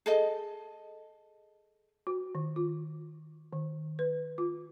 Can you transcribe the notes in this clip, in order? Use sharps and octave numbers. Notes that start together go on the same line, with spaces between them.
G#4 A4 D#5
F#4
D#3
F4
D#3
B4
F4